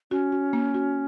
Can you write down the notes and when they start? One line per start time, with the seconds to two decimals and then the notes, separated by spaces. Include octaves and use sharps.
0.11 C#4 F#4
0.32 F#4
0.53 A#3
0.75 F#4